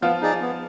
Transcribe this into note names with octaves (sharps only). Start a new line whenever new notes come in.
F3 B3 F4
D#4 G#4 D5
B3